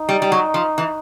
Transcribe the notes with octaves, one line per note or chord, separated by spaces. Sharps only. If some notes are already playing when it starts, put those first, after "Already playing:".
Already playing: D#4
G3
G3
F#3
F3
E3